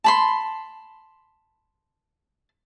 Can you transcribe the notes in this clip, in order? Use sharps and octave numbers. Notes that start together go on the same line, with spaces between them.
A5 B5 C6